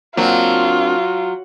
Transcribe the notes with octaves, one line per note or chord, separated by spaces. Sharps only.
F#3 A#3 C4 D4 F4